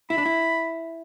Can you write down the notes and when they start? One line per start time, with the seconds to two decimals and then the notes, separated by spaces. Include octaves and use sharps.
0.10 E4 B5
0.18 D4
0.26 E4